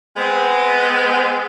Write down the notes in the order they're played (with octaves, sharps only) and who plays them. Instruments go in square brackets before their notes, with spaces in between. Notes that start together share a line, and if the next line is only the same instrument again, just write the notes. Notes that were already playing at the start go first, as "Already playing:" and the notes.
[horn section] G#3 B3 C4